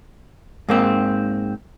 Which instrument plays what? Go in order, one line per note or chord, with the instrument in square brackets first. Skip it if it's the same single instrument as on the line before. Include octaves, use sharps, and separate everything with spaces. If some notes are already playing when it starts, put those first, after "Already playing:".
[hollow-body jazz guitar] G#2 A#3 C4